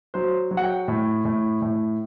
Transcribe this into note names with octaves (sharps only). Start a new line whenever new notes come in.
F#3 C5
F#3
F#5
G5
A2
A2
A2